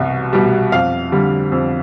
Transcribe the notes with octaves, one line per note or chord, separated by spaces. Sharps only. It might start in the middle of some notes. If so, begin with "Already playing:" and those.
Already playing: C2 B2 G3
B2 G3
F2 F5
D3 G3
F2